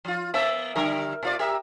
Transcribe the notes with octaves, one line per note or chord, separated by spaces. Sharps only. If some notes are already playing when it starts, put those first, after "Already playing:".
F3 F4
A#3 B3 E5
D3 G3 A#4
B2 F4 D5
G4 A#4 E5